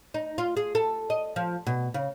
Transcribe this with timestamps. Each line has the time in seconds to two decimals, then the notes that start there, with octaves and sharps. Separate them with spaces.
0.14 D#4
0.38 F4
0.57 G#4
0.75 A4
1.10 D#5
1.36 F3
1.67 B2
1.94 C#3